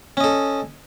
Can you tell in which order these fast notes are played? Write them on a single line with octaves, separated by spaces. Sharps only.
C#4 D#5 A4